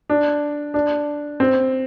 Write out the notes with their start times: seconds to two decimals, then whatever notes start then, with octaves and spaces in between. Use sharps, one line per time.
0.10 D4
0.74 D4
1.40 C4